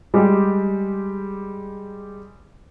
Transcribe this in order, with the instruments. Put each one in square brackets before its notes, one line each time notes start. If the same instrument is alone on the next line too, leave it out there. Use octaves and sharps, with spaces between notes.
[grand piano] G3 G#3 G4